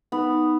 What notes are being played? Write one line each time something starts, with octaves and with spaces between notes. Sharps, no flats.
B3 D#4